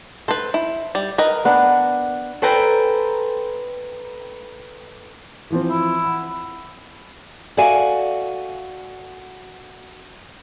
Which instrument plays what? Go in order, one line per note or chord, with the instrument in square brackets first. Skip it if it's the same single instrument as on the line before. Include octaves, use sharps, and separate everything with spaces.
[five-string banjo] A4 B4 [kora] C5
[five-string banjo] E4
G3
A#4 B4 D#5
[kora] B3 D4
[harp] A4 B4 C5 G5 G#5 A#5
[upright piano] E3 F3 C4
[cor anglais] E4
[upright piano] F#5
[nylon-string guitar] F#4 A4 D5 E5 F5 G#5